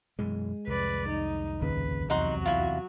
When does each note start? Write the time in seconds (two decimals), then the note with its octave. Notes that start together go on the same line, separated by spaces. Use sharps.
0.19 F#2 B2 E3 G#3
0.67 C2 F2 B4 D5
1.09 D#4
1.61 G#1 D#2 C#3 B4
2.10 E2 C3 F#3 D#4 F#4 F#5 C6
2.46 E4 F4